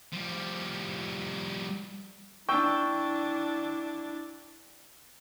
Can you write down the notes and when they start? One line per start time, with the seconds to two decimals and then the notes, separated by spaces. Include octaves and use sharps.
0.13 F3 G3
2.49 D4 E4 G5 C#6 E6